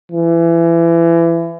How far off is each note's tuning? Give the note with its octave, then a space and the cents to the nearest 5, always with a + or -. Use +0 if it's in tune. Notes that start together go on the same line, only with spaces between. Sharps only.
E3 +25